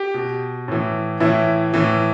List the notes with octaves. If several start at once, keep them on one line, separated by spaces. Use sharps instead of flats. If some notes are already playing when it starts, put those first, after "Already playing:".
Already playing: G4
B2
A2 E3
A2 E3 E4
A2 E3